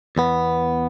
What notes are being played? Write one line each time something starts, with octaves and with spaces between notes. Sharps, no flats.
E2 B3